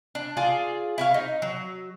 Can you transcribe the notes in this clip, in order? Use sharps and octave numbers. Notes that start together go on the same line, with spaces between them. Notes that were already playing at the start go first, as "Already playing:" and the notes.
D4
F4 G#4 D5
E4 C#5 F5
D#4
F#3